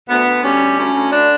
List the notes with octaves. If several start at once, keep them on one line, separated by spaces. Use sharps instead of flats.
D2 B3
D2
G3 C#4
D2
D2 C#4
D2
D3 D4